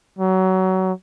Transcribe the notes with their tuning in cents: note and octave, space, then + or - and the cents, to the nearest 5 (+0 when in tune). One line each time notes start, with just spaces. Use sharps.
F#3 +25